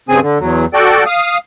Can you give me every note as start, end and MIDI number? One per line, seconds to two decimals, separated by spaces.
0.09 0.20 43
0.09 0.20 49
0.09 0.20 60
0.09 0.20 68
0.09 0.20 80
0.22 0.38 50
0.40 0.65 40
0.40 0.65 54
0.74 1.04 66
0.74 1.04 69
0.74 1.04 74
0.74 1.04 79
1.06 1.38 77
1.06 1.38 87